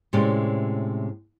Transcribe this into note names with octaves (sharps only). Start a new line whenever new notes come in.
A2 C3 G#3 C#4 G4 D5